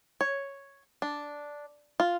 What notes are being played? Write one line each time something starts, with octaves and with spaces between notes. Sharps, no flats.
C#5
D4
F4